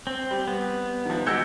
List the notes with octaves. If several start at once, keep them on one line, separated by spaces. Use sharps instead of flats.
C4
G3
B3
D#3 F3
G#3 F#4 G4 E6 G6 C#7